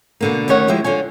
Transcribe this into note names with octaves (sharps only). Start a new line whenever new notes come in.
B2 D3 A#3
D2 D#3 C#4 C#5 F#5
F3 G#3 E4 G4
D3 F4 C#5 G#5